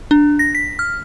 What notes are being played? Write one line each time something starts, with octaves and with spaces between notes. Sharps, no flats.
D4
A#6
B6
F6